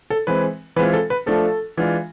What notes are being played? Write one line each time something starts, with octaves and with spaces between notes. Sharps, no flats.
A4
E3 G#3 C4 B4
E3 G#3 C4 F4 B4
A4
B4
F3 A3 D4 F4 A4
E3 G#3 D4 F4